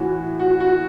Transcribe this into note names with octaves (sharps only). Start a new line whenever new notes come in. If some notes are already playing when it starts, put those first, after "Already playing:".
Already playing: A2 E3 F#4
F#4
F#4